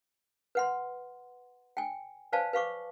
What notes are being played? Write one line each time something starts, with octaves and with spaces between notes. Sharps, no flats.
B4 F#5 C6
G5 G#5
B4 C5 D5 F5 G#5 A5
B4 F5 C#6 D6